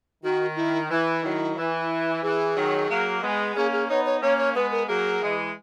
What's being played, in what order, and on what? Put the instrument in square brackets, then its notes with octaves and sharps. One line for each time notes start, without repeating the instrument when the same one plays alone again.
[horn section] D#3 [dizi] F#4
[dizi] E4
[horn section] E3 [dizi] E4
[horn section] D#3 F#3
E3
[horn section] E3 [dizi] G#4
[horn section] D#3 F#3
F#3 A#3
G#3 B3
[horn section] A#3 C#4 [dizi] G#4
[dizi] G#4
[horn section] B3 D#4 [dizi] C#5
[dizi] C#5
[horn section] A#3 C#4 [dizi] C#5
[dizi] C#5
[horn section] G#3 B3 [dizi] B4
[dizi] A#4
[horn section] F#3 A#3 [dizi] G#4
[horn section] E3 G#3